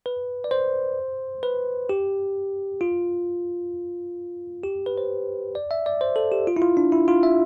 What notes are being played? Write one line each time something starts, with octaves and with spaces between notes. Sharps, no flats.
B4
D5
C5
B4
G4
F4
G4
B4
C5
D5
E5
D5
C5
A4
G4
F4
E4
F4
D4
E4
F4
E5